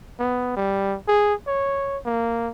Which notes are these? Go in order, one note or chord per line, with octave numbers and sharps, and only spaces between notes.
B3
G3
G#4
C#5
A#3